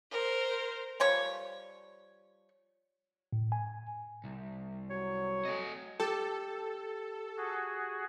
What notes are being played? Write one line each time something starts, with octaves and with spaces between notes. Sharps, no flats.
A#4 C5
F3 G3 C#5 C#6
A2
G#5
C2
F#3 C#5
A3 D#5
G4 A4
F#4 G#4